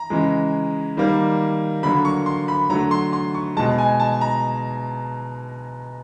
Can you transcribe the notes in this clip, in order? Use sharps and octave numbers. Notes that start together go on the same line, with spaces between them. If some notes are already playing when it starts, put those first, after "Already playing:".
Already playing: A#5
C#3 E3 G#3
D#3 G3 A#3
D3 F#3 A#3 B5
C#6
C6
B5
D3 F#3 A3 A#5
C6
C6
C#6
B2 G#3 A5
G#5
A5
A#5